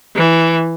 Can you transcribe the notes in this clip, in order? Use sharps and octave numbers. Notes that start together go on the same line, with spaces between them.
E3